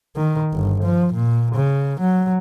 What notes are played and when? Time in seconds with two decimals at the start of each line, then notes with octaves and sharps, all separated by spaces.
0.17 D#3
0.53 G1
0.84 F3
1.14 A#2
1.55 C#3
2.00 F#3